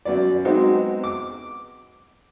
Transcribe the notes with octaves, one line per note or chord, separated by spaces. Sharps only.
F#2 F#3 B3 D5
F#3 G#3 B3 C4 D#4 F#4
D6